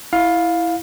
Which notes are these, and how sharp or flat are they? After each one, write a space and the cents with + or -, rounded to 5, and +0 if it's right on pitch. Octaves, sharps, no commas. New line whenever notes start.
E4 +0 F5 +15